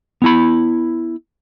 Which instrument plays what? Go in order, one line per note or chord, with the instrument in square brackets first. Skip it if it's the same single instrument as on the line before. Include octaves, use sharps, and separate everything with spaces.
[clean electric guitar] B3 E4 B5